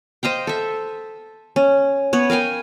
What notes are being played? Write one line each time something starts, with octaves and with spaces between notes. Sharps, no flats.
C5 D#5 F5 G5
A4 E5
C#4
B3 C#5
A#4 F5 G5 G#5